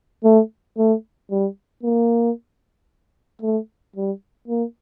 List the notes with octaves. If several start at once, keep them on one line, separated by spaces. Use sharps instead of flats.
A3
A3
G3
A#3
A3
G3
A#3